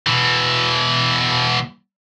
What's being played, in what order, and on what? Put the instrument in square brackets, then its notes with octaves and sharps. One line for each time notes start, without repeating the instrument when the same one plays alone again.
[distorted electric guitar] B2 E3